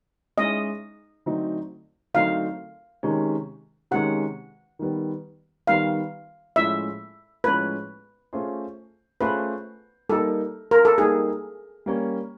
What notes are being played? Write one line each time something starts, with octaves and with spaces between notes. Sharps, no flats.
G#3 C#4 E4 D#5
D3 F#3 A3 C4 D#4
D3 F#3 A3 C4 D#4 F5
C3 D#3 G#3 C#4
C3 D#3 G#3 C#4 F#5
D#3 G3 B3
D#3 G3 B3 F5
A2 F3 G#3 C#4 E5
A2 F3 G#3 C#4 B4
A3 C#4 F4 G#4 C5
A3 C#4 F4 G#4 B4 C5
G3 A#3 D#4 G4 A4 A#4
A#4
A4
G3 A#3 D#4 G4 G#4 A#4
G3 A#3 C#4